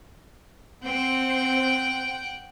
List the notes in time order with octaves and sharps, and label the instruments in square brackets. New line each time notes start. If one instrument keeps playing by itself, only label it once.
[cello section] C4 [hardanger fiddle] F#5 G5